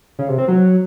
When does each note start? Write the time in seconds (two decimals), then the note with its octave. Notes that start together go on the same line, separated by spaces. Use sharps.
0.19 C#3
0.28 C3
0.38 C4
0.48 F#3